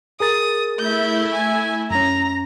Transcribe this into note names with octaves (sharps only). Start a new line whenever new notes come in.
G#4 A#4 D#6 A6
A3 E4 E5 G6
G#5
F#2 C#4 A#5